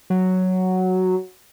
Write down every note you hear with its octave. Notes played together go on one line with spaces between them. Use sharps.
F#3